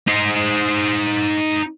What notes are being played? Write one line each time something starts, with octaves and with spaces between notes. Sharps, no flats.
D#4 C5